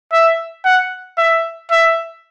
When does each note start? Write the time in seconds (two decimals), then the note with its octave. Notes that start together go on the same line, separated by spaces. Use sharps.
0.12 E5
0.65 F#5
1.18 E5
1.71 E5